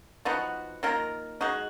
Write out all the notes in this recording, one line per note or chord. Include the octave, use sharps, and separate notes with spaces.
F3 B3 D#4 F#4
D#3 A#3 F4 A#4
G#3 D#4 F#4